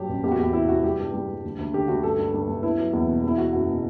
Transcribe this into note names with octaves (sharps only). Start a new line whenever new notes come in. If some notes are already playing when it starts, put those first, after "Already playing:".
Already playing: G2 F#3 G4
A1
E2 G4
F#4
E2 G4
C3 E4
C3 F#4
G3 G4
G2
G3
G3
D2
D2
D3 G4
D2 F#4
G2 A4
G2
G2
G2
B3 E4
F#3
E2
B2
E2 E4
B2 F#4
F#1 F#4
B2